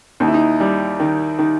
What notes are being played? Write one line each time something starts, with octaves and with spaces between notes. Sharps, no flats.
D#2 D#4
E4
D#4
G3
D#3
D#3